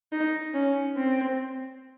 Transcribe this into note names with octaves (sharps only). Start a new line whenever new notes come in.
D#4
C#4
C4